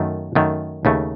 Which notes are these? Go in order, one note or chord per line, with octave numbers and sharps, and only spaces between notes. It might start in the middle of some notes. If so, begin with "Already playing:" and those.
Already playing: F#2 D#3 A3
F#2 D#3 A3
D#2 C#3 A3